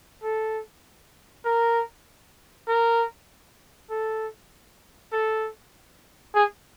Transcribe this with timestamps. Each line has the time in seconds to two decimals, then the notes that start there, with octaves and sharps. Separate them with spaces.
0.23 A4
1.45 A#4
2.68 A#4
3.90 A4
5.12 A4
6.35 G#4